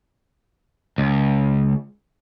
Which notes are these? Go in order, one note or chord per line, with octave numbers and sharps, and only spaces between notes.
C#2